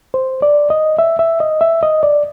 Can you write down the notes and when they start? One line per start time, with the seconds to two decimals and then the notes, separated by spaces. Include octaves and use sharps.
0.14 C5
0.42 D5
0.70 D#5
0.99 E5
1.19 E5
1.40 D#5
1.61 E5
1.83 D#5
2.03 D5